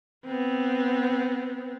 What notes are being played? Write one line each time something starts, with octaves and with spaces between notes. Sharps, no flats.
B3 C4